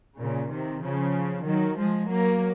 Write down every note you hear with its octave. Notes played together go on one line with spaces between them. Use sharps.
A#2 C#3
C3 D#3
C#3 F3
D#3 F#3
F3 G#3
F#3 A#3